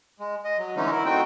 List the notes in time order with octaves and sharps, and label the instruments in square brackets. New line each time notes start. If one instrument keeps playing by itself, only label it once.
[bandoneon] G#3
D#5
F#3
D3 E3 G#3 A3 C#4 D#4
E4 A#4
A3 C4 D#4 F#4 G5